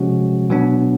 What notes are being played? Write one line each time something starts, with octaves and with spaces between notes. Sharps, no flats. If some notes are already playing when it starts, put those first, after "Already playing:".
Already playing: C3 F3 G#3 C#4 F#4
B2 F#3 B3 D4